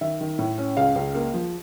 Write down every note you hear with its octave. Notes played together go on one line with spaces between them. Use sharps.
D#3 E5
D#3
A2
C#4
C#2 F5
C#2
A#3
F3